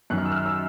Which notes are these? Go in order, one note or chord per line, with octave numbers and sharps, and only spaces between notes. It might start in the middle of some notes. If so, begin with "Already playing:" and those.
F#2 D#3 F#6
F6
E6
F6
E6